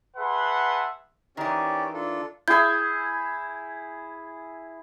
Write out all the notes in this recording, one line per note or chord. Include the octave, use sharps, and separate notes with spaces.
G#4 B4 E5 F#5 A5 C6
D#3 E3 C#4 G4 D5
D4 F4 A4
E4 G#4 G6